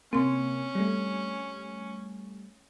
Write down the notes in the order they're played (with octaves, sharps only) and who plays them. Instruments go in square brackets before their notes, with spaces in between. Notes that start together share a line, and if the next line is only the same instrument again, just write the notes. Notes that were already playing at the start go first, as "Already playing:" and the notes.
[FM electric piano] C3 A#3 [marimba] C4 C6 [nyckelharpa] C#4
[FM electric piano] G3 A3